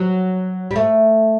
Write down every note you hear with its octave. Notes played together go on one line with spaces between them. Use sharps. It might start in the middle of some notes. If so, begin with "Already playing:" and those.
Already playing: F#3
G3
A3